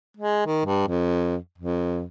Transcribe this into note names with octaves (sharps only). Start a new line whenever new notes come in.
G#3
D#3
G2
F2
F2